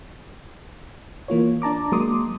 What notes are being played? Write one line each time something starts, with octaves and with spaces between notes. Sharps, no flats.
E3 A#3 F4 C#5
D4 A5 A#5 D6
F#3 G#3 A#3 C6 D6 D#6